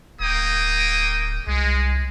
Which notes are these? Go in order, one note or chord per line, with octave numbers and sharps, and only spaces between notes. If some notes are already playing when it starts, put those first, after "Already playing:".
D1 A#3 G5 D#6
C2 G#3